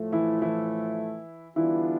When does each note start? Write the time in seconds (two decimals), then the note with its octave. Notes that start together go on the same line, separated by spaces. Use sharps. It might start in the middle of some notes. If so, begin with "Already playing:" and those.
Already playing: A2 F3 A3
0.12 E3 E4
0.42 E3 E4
1.56 D3 E3 G3 B3 D4 E4 F4